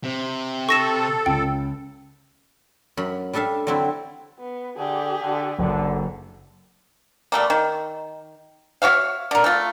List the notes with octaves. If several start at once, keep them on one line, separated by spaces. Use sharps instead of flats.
C3
A4 C#6 A#6 E7
C#2 G5
F#2 B5
G3 D4 A4 E5 F5
D3 F#3 C4 D4 E4
B3
D3 G4 G#4
D3
F#1 D3
G3 A3 A#3
D#3
F#4 C#5 E5 F5
D3 A#4
A3 F4